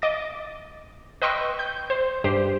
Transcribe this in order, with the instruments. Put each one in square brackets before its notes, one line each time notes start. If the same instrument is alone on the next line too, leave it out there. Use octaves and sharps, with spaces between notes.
[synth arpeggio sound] D#5 D6 A6
B4 D#5 G5 C6 C#6 E6
G6
C5
G2 G4 C5